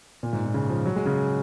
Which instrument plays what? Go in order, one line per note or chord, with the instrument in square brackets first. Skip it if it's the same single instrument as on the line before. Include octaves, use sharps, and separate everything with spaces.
[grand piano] A#2
G#2
A#2
C#3
F3
F#3
G#3
C#3